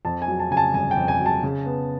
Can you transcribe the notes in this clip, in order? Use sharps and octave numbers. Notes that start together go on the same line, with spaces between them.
F2 A5
G#5
F#3
A5
C#3 G#5
A5
G1 G#5
G5
F2
G#5
F#3
A5
C#3
B3